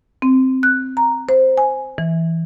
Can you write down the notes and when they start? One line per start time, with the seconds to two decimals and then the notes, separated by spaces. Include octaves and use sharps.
0.22 C4
0.63 F#6
0.97 A#5
1.29 C5
1.58 G#5
1.98 E3